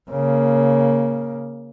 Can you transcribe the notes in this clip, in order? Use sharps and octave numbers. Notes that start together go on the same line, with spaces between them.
C#3 A#3